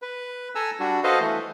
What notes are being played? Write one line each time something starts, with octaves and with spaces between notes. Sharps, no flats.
B4
A4 G#5 A#5 E6
G3 D4 F#4
F#4 A4 B4 C5 D#5 F5
E3 A3